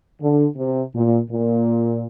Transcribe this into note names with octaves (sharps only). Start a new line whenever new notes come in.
D3
C3
A#2
A#2